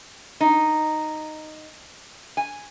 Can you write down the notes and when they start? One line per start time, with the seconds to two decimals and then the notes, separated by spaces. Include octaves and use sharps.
0.41 D#4
2.37 G#5